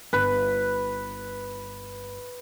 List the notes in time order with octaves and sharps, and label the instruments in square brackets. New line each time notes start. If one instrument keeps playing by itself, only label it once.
[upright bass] G1 [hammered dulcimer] B4